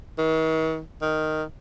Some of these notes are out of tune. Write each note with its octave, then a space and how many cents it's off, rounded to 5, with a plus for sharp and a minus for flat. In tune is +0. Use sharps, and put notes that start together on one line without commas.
D#3 +45
D#3 -5